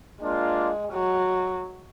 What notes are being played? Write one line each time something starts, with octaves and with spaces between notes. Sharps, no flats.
G#3 A#3 D4 F4
F#3